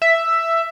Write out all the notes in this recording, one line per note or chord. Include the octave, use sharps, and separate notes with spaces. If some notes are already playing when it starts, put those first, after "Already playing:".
E5